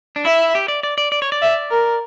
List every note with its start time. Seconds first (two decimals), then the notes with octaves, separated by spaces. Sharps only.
0.16 D4
0.25 E4 E5
0.55 G4
0.68 D5
0.83 D5
0.98 D5
1.12 D5
1.22 C#5
1.32 D5
1.42 E5
1.71 A#4